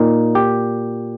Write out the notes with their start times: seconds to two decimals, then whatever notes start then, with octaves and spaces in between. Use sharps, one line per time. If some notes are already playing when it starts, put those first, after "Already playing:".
Already playing: A#2 A#3 D#4
0.35 G4